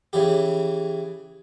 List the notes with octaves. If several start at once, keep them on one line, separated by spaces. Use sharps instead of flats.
C#3 E3 G4